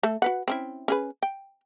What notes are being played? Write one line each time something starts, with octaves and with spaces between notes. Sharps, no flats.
A3 A4
F#4 B4 F#5
C4 C#4 E4
C#4 G#4 B4
G5